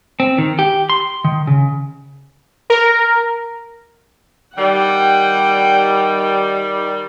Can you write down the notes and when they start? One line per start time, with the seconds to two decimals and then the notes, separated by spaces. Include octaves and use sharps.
0.20 C4
0.38 D#3
0.59 G4
0.90 C6
1.24 D#3
1.47 C#3
2.70 A#4
4.58 D#3 G3 F#5 G5